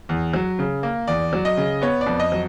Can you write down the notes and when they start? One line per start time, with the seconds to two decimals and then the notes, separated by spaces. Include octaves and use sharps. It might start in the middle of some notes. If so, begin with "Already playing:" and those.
0.09 E2
0.33 F#3
0.59 C#3
0.83 A#3
1.08 E2 D5
1.33 F#3
1.45 D#5
1.57 C#3
1.81 B3 C#5
2.01 D5
2.07 F2
2.20 D#5
2.32 F#3